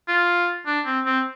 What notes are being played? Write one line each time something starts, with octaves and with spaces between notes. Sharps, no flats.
F4
D4
C4
C4